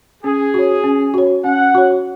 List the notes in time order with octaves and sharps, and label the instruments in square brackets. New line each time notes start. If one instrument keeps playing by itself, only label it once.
[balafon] C#4 [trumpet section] G#4
[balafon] F#4 C#5
C#4
F#4 C#5
[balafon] C#4 [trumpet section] F#5
[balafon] F#4 C#5